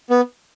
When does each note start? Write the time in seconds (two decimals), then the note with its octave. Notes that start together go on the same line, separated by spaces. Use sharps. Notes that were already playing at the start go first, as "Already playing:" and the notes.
0.10 B3